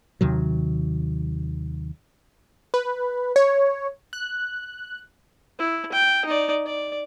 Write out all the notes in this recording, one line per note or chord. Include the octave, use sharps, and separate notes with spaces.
D#2 C3 D#3 F#3
B4
C#5
F#6
E4
G5
D#4 D5
D5